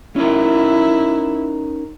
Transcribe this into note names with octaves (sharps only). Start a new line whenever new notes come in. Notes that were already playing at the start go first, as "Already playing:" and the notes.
C#4 D#4 E4 A#4